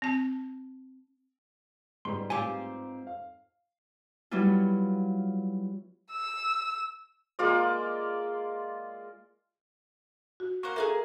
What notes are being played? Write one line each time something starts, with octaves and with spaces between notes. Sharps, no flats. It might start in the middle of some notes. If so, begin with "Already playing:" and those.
C4 A5
G#2 G3 B3 C6
C4 F4 G4 G#5
F5
F#3 G3 B3 E4 F4
E6
G#3 A#3 F4 D5
F#4
A#3 C5 F#5 C#6
A#3 D4 G#4 A4 E5